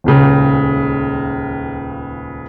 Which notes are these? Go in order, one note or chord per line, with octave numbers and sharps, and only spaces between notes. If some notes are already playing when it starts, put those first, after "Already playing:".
D#1 C#2 C#3